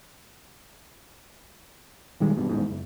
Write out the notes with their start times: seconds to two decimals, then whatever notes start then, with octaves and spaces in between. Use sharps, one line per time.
2.20 A#2 D#3 G3 G#3
2.37 G#1 G2 B2
2.49 D#1 A1 E2 G#2
2.68 F#1